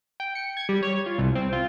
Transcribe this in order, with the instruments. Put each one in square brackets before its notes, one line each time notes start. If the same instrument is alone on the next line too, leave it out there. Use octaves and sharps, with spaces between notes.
[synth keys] G5
C#7
G#6
G3
C#5
F4
C2
C4
F4